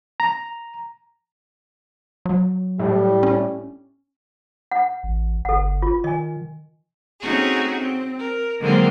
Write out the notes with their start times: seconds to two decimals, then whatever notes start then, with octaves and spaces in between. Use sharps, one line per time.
0.20 A#5
2.26 F#3
2.79 A2 G3
3.23 C#4
4.71 F#5
5.03 A1
5.45 G1 A4 F#5
5.82 F4
6.04 D#3 D#5 G#5
7.21 A3 C4 C#4 D#4 F#4 G#4
7.78 C4
8.19 A#4
8.60 D3 D#3 F#3 G#3 A#3 C4